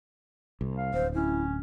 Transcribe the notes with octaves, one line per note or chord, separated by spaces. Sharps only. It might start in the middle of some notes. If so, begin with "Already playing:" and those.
C2
F5
D1 C5
C#4 E4